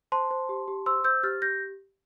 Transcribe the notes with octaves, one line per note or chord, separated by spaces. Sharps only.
C5 A5 C6
C5
G4
G4
C5 C6 E6
C5 E6 G6
G4 F6 A6
G4 G6 A#6